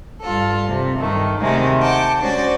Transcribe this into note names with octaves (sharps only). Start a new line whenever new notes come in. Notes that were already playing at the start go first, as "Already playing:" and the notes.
G2 F4 A4
C3
G2 D#3 A3
D2 C3 D#3 G#3 A3
F#5 G5 A5 D6
G#3 C#4 D4 F#4 C5 D5